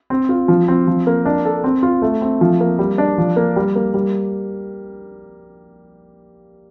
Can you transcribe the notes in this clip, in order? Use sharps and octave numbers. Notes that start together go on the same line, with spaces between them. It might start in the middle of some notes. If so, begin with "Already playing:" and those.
C4
F4
F3
C4
F3
A#3
D4
A4
C4
F4
A3
C4
F3
A#3
G3
D4
F3
A#3
G3
A#3
G3